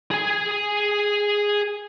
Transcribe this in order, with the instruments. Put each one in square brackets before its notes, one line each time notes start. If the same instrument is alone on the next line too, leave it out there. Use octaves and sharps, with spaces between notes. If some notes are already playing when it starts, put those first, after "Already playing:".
[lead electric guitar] G#4 G#5